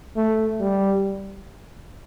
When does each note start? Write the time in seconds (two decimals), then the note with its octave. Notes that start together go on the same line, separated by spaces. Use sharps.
0.16 A3
0.60 G3